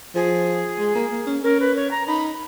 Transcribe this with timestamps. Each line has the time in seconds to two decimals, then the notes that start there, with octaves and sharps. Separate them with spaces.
0.15 F3 G#4
0.79 G#3
0.95 A#3
1.11 A#3
1.27 C#4
1.43 C#4 A#4
1.60 B4
1.76 C#5
1.91 A#5
2.07 D#4 B5